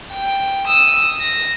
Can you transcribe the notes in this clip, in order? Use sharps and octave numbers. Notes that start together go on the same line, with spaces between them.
G5
D#6 E6
A#6